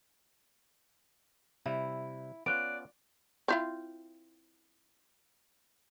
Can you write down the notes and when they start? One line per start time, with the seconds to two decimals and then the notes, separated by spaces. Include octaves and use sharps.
1.66 C3 G3 E4
2.46 B3 C#4 F4 D5 F#6 D7
3.48 C4 E4 F4